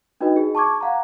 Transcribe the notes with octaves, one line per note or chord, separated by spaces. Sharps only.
D4 D#4 F#4 B4 D#5
G#4
A5 C#6 D6 G#6
F5 F#5 A#5